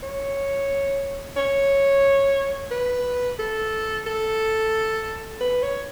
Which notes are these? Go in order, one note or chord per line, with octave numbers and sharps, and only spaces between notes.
C#5
C#5
B4
A4
A4
B4
C#5